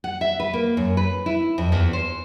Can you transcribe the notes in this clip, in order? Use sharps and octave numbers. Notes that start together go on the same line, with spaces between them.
F#5
E5
B4
A#3
F#2
B4
E4
F2
E2
C5